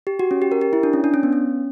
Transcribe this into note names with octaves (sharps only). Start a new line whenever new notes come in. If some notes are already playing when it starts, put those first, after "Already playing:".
G4
F#4
C#4
G4
A#4
G4
E4
D4
C#4
D4
C#4
B3
C#4